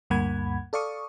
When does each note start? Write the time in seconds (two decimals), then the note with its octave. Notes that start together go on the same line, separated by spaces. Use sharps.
0.10 D2 G2 A#3 F#5 B5 G#6
0.73 A4 D5 F5 C#6 D#6